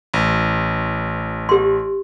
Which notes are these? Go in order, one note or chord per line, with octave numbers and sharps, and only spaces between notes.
A1
G4 C6